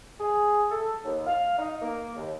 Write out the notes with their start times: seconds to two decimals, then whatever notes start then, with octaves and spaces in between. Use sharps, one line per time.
0.20 G#4
0.70 A4
1.05 D#2
1.27 F5
1.58 D#4
1.82 A#3
2.16 D#2